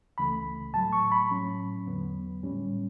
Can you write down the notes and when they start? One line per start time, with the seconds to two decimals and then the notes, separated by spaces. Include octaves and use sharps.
0.18 C#2 C#3 E3 A3 B5
0.74 A2 F#3 A3 A5
0.93 C#6
1.12 B5
1.31 A2 F#3 C#4
1.87 E2 D3 F#3 B3
2.43 A2 G3 C#4